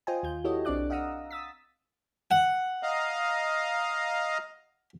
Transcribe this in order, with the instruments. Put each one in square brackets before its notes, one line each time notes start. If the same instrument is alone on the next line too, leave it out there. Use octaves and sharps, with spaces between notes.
[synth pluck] F4 C5 D#5 G5 G#5
D#2 F4 G6
E4 F#4 G4 A4 C#5 D#5
B1 C4 D4 D5 D6 F#6
D#5 F5 F#5 A#5 D#6 E6
D#6 E6 A6 B6
[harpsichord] F#5
[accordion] D#5 F5 A#5